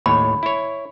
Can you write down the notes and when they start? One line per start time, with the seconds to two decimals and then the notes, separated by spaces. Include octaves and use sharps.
0.06 D#2 A2 C#5 B5
0.43 E4 C#5